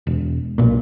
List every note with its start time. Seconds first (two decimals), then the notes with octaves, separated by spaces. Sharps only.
0.07 E1
0.58 B1 A#2